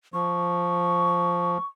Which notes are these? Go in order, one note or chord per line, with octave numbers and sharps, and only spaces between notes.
F3 C#6